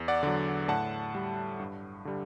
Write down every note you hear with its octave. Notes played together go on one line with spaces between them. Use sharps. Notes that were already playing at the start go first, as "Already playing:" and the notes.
Already playing: E2
D5 F#5
D3 F#3
A2 F#5 A5
G3
G2
D3 G3